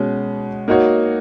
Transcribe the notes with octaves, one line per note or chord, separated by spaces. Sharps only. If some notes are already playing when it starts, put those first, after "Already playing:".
Already playing: B2 G#3 C#4
A#3 D#4 F#4 C#5